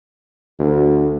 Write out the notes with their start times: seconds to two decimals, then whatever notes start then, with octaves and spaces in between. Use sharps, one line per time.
0.59 D2